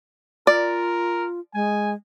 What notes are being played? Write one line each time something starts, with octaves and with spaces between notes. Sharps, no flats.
F4 A#4 D5
G#3 G#5